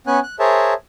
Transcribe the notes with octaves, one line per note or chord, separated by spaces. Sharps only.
B3 C#4 G#5 F#6
F#6
G#4 A#4 C5 C#5 E5 A5